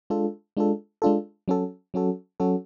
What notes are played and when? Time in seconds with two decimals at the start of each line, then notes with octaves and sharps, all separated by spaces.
0.10 G#3 D4 F4 A4
0.57 G#3 D4 F4 A4
1.02 G#3 D4 F4 A4
1.48 F#3 C#4 F#4 A4
1.94 F#3 C#4 F#4 A4
2.40 F#3 C#4 F#4 A4